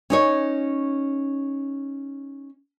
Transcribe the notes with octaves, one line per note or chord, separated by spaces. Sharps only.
C#4 D#4 C#5